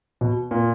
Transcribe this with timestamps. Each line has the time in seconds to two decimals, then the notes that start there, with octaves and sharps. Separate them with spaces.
0.21 B2
0.51 A#2